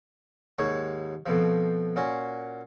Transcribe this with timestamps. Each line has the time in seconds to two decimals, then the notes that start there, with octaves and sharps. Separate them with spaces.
0.58 D#2 G#2 C#5 C#6
1.26 F2 B2 F3
1.96 A#2 C#4 F#4